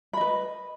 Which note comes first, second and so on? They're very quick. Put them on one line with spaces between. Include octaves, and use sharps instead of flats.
B5 D#5 B4